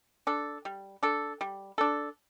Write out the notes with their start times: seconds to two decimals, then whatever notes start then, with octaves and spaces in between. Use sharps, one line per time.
0.27 D4 A4
0.65 G3
1.03 D4 A4
1.41 G3
1.78 D4 A4